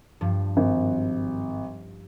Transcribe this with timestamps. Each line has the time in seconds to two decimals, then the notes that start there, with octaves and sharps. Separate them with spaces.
0.21 G2 F3
0.57 G#1